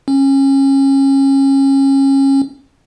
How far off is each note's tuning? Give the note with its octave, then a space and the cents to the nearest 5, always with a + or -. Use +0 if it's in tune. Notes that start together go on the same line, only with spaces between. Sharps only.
C#4 -25